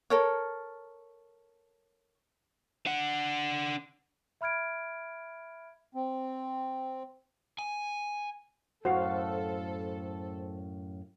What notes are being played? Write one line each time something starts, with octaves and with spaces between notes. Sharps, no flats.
A4 A#4 C#5
D4 F#5
E5 B5 F6 G#6 D7
C4
G#5
F#2 A2 F#4 A4 C5 F5